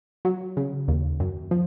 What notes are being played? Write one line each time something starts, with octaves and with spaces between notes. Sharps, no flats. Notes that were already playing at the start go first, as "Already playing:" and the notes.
F#3
C#3
D#2
F#2
F3